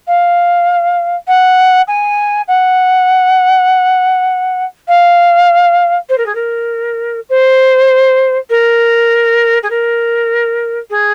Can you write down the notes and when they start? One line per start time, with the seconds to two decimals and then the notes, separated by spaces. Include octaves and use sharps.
0.07 F5
1.27 F#5
1.88 G#5
2.48 F#5
4.88 F5
6.09 C5
6.18 A#4
6.26 G#4
6.35 A#4
7.29 C5
8.50 A#4
9.63 G#4
9.70 A#4
10.90 G#4